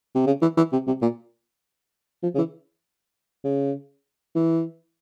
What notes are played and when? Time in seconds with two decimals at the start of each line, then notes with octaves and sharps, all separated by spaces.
0.15 C3
0.27 C#3
0.42 E3
0.57 E3
0.72 C3
0.87 C3
1.02 A#2
2.23 F3
2.35 C#3
2.38 E3
3.44 C#3
4.35 E3